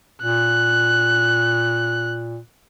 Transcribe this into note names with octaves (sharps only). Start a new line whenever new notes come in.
A#2 F#6